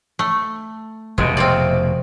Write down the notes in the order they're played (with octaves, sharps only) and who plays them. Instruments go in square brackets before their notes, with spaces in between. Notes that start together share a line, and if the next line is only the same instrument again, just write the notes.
[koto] A3
[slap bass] F1 B2 [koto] G#3
[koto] C4 F4 D5